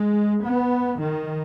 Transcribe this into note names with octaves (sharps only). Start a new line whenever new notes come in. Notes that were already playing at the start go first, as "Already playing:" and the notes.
Already playing: G#3
B3
D#3